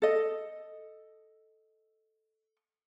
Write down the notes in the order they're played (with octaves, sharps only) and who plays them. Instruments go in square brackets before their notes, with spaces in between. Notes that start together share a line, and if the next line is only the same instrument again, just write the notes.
[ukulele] A4 D#5